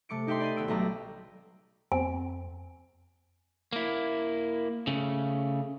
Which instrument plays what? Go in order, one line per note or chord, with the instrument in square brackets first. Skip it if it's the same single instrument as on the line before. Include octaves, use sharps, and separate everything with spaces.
[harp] C3 A3 D6 C#7 D7
D#4 G4 E5 G5 C6
D5 B5 C7 D#7
D#1 B3 E6 D7
B1 G3 A3 A#5 B5 D6
[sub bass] F2 [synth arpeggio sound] C4 [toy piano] G#5
[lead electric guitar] A#3 E4
C#3 A3